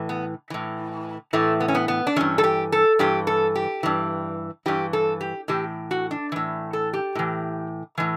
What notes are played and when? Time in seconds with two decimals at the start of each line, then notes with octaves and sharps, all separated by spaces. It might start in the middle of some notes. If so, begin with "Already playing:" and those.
Already playing: A2 E3
0.09 B3
0.50 A2 E3
1.33 A2 E3 A3
1.60 B3
1.68 C#4
1.75 B3
1.88 B3
2.07 D4
2.16 G2 E3 C#4
2.38 A4
2.44 G4
2.72 A4
2.99 G2 E3 G4
3.27 A4
3.55 G4
3.83 G2 E3
4.66 G2 E3 G4
4.93 A4
5.21 G4
5.48 A2 E3 G4
5.91 F#4
6.11 D4
6.32 A2 E3
6.73 A4
6.93 G4
7.15 A2 E3
7.98 A2 E3